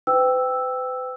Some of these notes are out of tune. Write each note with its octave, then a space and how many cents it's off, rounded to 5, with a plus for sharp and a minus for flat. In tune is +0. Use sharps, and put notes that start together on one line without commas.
B4 +45 G5 +0 E6 +0